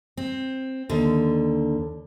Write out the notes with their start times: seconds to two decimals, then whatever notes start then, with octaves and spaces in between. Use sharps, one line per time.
0.17 C4
0.89 D#2 D3